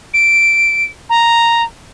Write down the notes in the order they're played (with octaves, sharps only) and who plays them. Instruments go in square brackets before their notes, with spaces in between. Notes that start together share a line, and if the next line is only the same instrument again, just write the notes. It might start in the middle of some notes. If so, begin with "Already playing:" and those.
[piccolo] D7
A#5